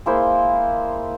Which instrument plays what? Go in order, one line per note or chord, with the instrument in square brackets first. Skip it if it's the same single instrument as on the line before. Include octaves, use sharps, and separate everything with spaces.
[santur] G#3 A#3 E4 C5